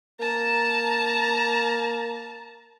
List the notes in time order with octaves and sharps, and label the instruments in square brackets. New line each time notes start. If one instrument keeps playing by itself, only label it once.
[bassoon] A#3 [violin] A5 A#5